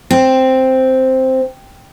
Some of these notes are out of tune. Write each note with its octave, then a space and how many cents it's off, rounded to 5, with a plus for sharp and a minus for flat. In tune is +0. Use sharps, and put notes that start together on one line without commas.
C4 +0 A5 +0